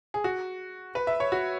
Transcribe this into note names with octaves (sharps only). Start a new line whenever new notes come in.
G#4
F#4
B4
E5
C#5
F#4